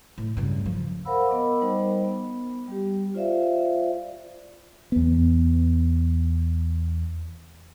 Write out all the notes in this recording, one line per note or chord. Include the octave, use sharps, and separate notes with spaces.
A2
G2 C#3
F3
A#4 C5 F5 F#5 B5 E6
B3 A#4 D#5 B5 D6
G3 D#4 C5 D#5
B3
G3 G4
F4 C5 D5 E5 F5
E2 B3